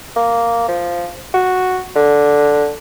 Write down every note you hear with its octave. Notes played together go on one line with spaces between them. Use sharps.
A#3
F3
F#4
D3